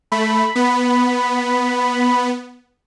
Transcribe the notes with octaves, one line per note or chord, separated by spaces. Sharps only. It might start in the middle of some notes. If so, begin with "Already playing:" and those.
A3 B5
B3